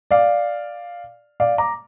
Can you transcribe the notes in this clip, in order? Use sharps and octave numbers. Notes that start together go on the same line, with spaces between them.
D5 F5
D5 F5
A#5 D6